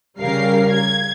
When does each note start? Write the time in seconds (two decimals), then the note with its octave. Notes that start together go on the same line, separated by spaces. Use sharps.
0.19 C#3 G3 A#4 F5 C7
0.70 G#6